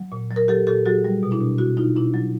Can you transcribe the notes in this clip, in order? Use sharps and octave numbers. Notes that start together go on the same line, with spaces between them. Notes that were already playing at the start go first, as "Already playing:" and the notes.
Already playing: F#3
A#2
F#3
A#4
F#3 G4 A4
A#2 G4 A4
F#3 F#4 G#4
G3
B2
D4 E4
B2
B2 E4 F#4
B2 D#4 F4
B2 D4 E4
F#3